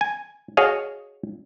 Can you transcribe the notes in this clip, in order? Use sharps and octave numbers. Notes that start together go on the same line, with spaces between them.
G#5
F#4 G#4 C#5 D#5 F5